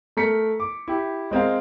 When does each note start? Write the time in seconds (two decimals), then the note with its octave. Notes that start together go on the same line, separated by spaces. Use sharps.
0.17 A3 A#4 B6 C#7
0.60 D6
0.88 E4 G4
1.31 G#3 C4 A#4 F5